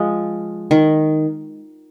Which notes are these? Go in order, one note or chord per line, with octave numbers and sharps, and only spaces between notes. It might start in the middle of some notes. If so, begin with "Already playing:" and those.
Already playing: F3 G#3
D#3